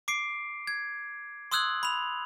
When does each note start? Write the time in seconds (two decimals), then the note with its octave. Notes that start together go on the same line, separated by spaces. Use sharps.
0.08 D6 C7 D7
0.67 G#6
1.52 C6 D#6 E6 F#6 G#6 F#7
1.83 B5 F7